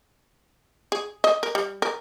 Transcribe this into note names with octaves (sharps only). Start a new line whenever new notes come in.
G#4
D#5
A#4
G3
A#4